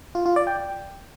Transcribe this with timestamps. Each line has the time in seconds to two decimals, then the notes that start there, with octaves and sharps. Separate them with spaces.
0.15 F4
0.26 F4
0.36 D5
0.47 G5